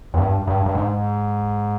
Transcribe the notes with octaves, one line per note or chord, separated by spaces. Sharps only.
E2
G2
G2
G2
G#2